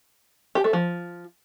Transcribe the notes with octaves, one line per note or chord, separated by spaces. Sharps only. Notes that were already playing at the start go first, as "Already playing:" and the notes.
G4
A3
F3